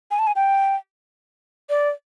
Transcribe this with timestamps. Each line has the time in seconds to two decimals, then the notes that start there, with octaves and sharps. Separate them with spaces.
0.11 G#5
0.19 A5
0.27 G#5
0.36 G5
1.69 D5